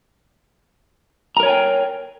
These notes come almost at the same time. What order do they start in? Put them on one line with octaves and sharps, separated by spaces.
A#5 A#4 C#5 G#5 G5